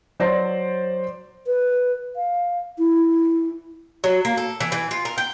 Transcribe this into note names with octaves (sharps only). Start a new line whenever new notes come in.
F#3 C5 D5 A#6
B4
F5
E4
F#3
A#3
A4
E3
E3
F4
A#4
G5